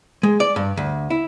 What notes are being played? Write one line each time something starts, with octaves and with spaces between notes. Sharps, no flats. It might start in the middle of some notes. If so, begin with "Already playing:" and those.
G#3
D5
G2
D2
E4